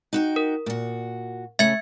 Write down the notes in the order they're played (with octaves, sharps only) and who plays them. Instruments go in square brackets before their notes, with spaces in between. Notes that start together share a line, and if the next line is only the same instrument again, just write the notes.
[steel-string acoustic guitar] D#4 F#4 G5
[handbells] A#4
[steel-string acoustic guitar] A#2 F#4
[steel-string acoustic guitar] C#3 A3 C#4 [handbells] E5 G#6 C#7